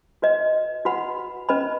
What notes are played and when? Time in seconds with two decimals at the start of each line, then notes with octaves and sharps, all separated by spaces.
0.22 F#4 B4 D#5
0.85 F#4 B4 F#5 B5
1.49 C#4 B4 D#5 B5